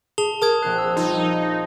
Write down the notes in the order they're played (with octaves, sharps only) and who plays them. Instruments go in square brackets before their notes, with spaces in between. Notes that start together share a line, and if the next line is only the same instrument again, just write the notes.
[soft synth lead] G#4 [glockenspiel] A5 F7 G7
[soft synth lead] A#4 [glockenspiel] A5 D#6 G#6
[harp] A#1 C4 C7 [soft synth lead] F#6
[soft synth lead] E6
[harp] F3 G3 [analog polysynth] D#4 [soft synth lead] F4